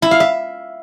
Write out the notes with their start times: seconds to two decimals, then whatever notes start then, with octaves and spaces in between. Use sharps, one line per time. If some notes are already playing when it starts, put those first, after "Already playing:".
0.02 E4
0.11 F5
0.20 E5